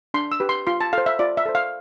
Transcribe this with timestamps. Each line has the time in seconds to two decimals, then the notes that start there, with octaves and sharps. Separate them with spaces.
0.14 D4 C6
0.32 E6
0.40 G4 B4
0.49 C6
0.67 F4 C6
0.81 A5
0.93 A4 C5 F5
1.06 E5
1.19 F4 D5
1.37 E5
1.46 A4 C5
1.55 F5